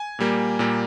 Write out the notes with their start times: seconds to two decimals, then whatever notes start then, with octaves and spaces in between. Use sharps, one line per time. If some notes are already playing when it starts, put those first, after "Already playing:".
Already playing: G#5
0.19 A#2 G3 A#3
0.59 A#2 G3 A#3